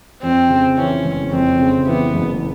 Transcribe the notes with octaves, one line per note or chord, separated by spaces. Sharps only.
F2 C4
C#3
E3 C#4
F#1
F2 C4
C#3
E3 B3
F#1